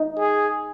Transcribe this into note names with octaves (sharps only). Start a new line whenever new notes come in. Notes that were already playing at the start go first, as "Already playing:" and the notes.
Already playing: D#4
G#4